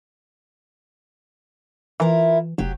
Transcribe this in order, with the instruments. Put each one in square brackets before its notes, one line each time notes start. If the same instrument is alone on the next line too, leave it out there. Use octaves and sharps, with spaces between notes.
[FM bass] E3 [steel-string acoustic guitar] E4 F4 A#4
[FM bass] F1 [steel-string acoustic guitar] F#3 G4